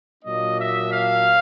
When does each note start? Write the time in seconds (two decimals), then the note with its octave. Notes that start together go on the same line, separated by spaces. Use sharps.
0.24 A#2 F#3 A#3 D4 D#5
0.58 E5
0.91 F5